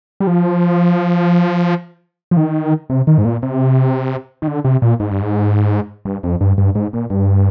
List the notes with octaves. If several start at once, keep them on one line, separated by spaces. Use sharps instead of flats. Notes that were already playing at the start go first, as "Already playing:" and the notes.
G3
F3
F3
D#3
C3
D#3
G#2
A#2
C3
D#3
D3
C3
A#2
G#2
G2
G#2
G2
F2
G2
G2
G#2
A#2
G2